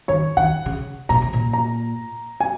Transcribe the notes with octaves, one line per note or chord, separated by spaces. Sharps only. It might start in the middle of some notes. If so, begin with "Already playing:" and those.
D#3 C#5
D#3 F#5
C#3
A#2 A#5
C3
A#2
A#5
G#5